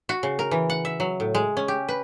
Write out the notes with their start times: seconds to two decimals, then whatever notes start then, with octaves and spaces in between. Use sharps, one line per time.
0.09 F#4
0.23 C#3
0.39 A#4
0.51 E3
0.70 F#5
0.85 E5
1.00 F#3
1.20 A2
1.35 G#3
1.57 C#4
1.68 G4
1.89 B4